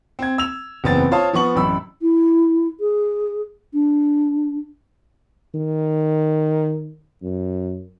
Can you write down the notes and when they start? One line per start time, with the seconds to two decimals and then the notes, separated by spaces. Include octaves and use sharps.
0.19 C4 G#6
0.38 E6 F7
0.84 F#1 E2 B3 C4 A6
1.11 F4 C5 C#5 F5 A5 D#6
1.33 F3 B3 C#6 F#7
1.56 A1 F#2 B5 E6
2.02 E4
2.80 G#4
3.73 D4
5.54 D#3
7.22 F#2